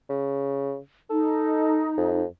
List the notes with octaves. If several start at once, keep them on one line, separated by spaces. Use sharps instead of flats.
C#3
D#4 A4
F2